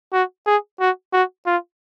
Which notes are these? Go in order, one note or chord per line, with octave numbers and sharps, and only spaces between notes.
F#4
G#4
F#4
F#4
F4